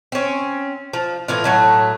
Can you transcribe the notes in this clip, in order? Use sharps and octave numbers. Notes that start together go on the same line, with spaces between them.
C4 C#4
F3
A2 E3 F4
A2 F#3 A3